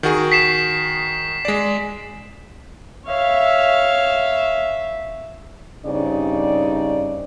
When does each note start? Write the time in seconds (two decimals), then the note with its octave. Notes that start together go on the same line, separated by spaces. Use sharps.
0.03 D#3 F#4 G#4
0.32 B6 C7 E7
1.45 G#3 D5
3.07 C#5 E5 F5
5.85 G2 C#3 C4 D#4 D5